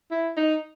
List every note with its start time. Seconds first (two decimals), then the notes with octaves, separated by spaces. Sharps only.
0.11 E4
0.37 D#4